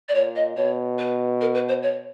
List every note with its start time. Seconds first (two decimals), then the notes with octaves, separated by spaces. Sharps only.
0.08 D5
0.14 A#2 C#5
0.35 D#5
0.56 B2 C#5
0.98 B4
1.40 A#4
1.54 B4
1.68 C5
1.82 C#5